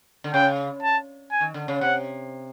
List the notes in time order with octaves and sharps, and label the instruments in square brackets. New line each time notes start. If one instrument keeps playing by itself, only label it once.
[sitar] D3
[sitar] C#3 [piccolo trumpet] G5
[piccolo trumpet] A5
G#5
[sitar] D#3
D3
C#3
[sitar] C3 [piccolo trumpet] F#5